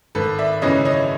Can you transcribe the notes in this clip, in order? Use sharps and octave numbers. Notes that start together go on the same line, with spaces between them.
G#1 A4 B4
D5 E5
F#2 C#3 E3 C#5 D#5
C#5 D#5